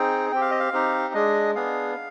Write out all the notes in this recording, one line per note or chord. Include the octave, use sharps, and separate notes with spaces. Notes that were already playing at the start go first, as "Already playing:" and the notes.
Already playing: C4 D#4 G#4 G5
C4 G4 G5
F5
D#5
F5
C4 D#4 G4
G#3 D4 G#4 D#5
B3 D4 G#4 F5